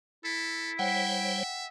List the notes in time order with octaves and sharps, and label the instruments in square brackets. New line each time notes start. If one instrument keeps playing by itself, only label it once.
[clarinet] E4 [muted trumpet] A4
[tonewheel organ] G3 C5 C#5 [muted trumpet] E5 [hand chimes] F#5 G5